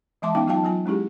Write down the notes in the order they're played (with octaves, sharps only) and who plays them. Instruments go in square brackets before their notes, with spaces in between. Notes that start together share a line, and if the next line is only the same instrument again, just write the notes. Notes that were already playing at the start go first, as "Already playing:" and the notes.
[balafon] E3 G#3 E5 A5 C6 D6
B3 C#4 D#4 F5 G5 D6
F#3 D#4 F4 F5 G5 A5
F#3 F4 G#5
G#3 C#4 E4 G4 G#4